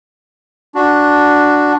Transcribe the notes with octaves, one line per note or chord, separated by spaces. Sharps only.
D4 F#4